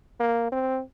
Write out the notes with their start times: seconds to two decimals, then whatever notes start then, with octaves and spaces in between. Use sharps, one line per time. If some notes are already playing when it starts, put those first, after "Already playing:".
0.20 A#3
0.52 C4